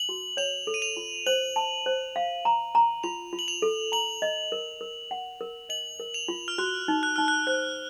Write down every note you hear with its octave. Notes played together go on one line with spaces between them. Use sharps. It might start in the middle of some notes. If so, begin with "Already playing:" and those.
Already playing: F#7
F#4
C#5 F7
A4
D#7
F7
F4
C5 F#7
A5
C5
F5
A#5
A#5
F4 F7
F4
F#7
F7
A4
A#5 F#7
D#5
A#4
A#4
F#5
A#4
D#5 F#7
A#4
F7
F4
F6
F#4 F#6
D#4
F#6
D#4 F6
F#6
C5 F#6